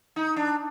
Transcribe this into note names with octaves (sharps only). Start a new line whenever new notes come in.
D#4
D4